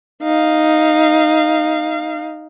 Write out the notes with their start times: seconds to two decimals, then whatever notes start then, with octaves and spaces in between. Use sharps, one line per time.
0.23 D#4 F5